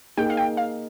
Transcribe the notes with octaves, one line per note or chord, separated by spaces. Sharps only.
A#3 D#4 G#4 G5
F5
G5
F5